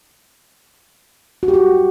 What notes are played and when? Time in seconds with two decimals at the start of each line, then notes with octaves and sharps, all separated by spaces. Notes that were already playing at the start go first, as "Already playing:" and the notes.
1.43 F#4
1.48 G4
1.54 F#4